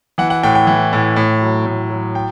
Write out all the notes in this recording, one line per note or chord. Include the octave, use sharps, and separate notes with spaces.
E3 F#5
F#5
A2 G5
G5
E3
A2
A2
F#3
A2
F#3
G5